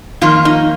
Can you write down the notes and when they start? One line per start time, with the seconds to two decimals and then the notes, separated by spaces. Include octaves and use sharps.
0.21 F2 D#3 A#3 F4
0.45 D#4